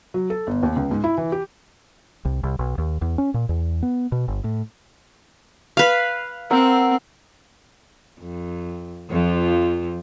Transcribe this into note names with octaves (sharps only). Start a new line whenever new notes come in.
F#3
A4
G1
D#2
C#2
G#2
E4
E3
G4
C2
C2
B1
D#2
E2
C#4
A#2
E2
B3
B2
G1
A2
B4 F5
C4 A#4 F#5 E6
F2
F2 F3